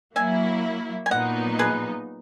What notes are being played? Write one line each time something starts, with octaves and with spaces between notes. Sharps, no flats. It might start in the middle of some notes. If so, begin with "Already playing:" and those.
F#3 A#3 E4 E5 G#5
G#5
A#2 F#3 B3 D#4 D#5 F#5
G#4 B4